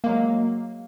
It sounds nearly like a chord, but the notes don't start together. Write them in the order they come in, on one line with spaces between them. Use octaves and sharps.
A#3 G#3 F#3